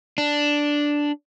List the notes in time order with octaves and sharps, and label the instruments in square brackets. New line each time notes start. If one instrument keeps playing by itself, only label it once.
[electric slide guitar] D4